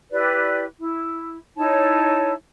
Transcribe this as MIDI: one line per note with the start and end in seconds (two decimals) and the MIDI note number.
0.12 0.64 64
0.12 0.64 67
0.12 0.64 71
0.12 0.64 74
0.79 1.38 64
1.57 2.32 63
1.57 2.32 64
1.57 2.32 73
1.57 2.32 81